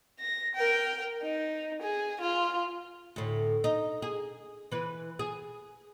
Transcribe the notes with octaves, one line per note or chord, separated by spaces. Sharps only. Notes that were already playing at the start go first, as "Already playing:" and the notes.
A#6
A#4 G5
D#4
G#4
F4
D2 A2
D#4
G#4
E3 B4
G#4